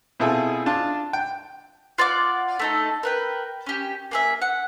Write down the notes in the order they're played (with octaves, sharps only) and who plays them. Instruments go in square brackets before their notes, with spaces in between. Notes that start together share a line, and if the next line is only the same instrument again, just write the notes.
[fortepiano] B2 C4 E4 F4 G#4 A4
D4 F4 A5
G5
[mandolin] F4 D5 F#5 D6
A3 D#4 A4
A#4 B4 G5
C#4 G4
A#3 G#4 E5
F#5